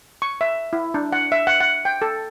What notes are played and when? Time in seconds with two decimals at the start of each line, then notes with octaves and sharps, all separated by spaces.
0.22 C#6
0.41 E5
0.73 E4
0.94 D4
1.13 F#5
1.32 E5
1.47 F#5
1.61 F#5
1.85 G5
2.02 A4